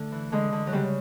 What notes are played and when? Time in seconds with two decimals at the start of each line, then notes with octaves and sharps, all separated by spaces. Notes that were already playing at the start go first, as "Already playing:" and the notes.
Already playing: D3 A3
0.12 E3
0.32 D3 G#3
0.52 D3
0.67 F#3
0.73 C#3 G3